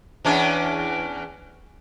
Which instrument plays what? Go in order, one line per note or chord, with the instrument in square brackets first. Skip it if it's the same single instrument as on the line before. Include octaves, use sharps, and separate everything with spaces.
[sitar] E2 C#4 D4